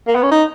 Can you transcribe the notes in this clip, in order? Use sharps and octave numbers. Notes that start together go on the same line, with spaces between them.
A#3
B3
C#4
D#4